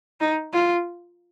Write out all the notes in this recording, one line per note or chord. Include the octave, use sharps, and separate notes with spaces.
D#4
F4